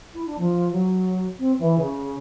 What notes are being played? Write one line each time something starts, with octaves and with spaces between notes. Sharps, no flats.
E4
D4
F3
F#3
C4
E3
C#3